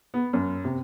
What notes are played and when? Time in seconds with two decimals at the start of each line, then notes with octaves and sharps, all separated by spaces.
0.14 B3
0.33 F#2
0.65 C3